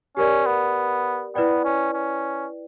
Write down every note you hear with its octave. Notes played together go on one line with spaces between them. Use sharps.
C#4 G4 A#4 D5
B3
B3 E4 B4 D5 G5
C#4
C#4